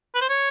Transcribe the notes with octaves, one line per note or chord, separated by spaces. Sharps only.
B4
C5
C#5